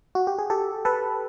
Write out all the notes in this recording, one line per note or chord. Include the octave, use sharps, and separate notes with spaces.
F#4
G4
G#4
G4 A4
A4 B4